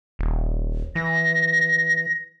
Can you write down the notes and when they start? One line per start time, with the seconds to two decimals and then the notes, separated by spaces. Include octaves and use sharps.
0.19 D#1
0.95 E3 A#6